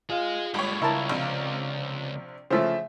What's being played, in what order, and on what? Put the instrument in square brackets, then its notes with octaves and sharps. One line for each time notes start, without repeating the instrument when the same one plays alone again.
[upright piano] F4 [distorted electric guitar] G#4 D#5
[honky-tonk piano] G1 C#5 [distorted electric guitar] G#3 G4
[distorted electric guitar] C#2 [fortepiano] E4 A#4 A5
[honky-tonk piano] A#1 C3
[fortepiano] C#3 F3 A3 [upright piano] C5 E5